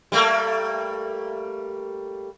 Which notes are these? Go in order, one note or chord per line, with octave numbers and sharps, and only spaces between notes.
G3 A3 A#3